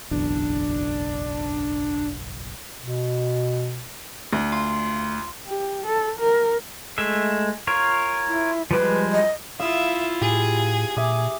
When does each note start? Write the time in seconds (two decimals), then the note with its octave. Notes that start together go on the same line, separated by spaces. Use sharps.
0.11 F#1 B1 E2 D4
2.80 B2
4.33 D2
4.52 F4
5.47 G4
5.86 A4
6.20 A#4
6.98 G#3 A3 E5
7.67 F4 A#4 C#5
8.27 E4
8.71 F3 G3 G#3 B4
9.13 D#5
9.60 E4 F4 E5 F5 D#6 E6
10.21 A2 G4 G#4
10.97 A#2 E5 G#5 D6 D#6